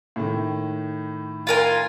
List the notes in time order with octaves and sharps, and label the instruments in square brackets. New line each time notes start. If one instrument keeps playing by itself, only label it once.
[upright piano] A2 D#3
[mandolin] F4 A#4 G#5